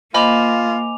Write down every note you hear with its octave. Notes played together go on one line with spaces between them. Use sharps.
A#3 F4 C5 D#5 G#5 B5 D6 F7